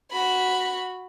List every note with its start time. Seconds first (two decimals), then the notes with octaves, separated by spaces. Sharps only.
0.12 F#4 B5